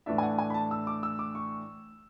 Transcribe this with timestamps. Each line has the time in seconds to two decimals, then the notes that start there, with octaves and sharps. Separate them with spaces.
0.06 A2 E3 A3 D4 E5
0.18 G#5
0.22 F#5
0.38 G#5
0.50 B5
0.54 A5
0.71 E6
0.87 D6
1.03 E6
1.19 D6
1.35 C#6